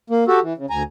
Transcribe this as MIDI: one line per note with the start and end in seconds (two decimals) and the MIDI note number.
0.10 0.24 58
0.28 0.40 66
0.28 0.40 67
0.28 0.40 69
0.43 0.53 52
0.57 0.66 49
0.70 0.83 38
0.70 0.83 80
0.70 0.83 82